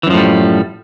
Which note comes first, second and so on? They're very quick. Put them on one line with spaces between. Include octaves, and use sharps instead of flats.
E3 F#2 F3 A2 G3